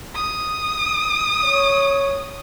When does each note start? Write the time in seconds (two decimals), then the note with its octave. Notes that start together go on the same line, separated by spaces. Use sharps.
0.15 D#6
1.44 C#5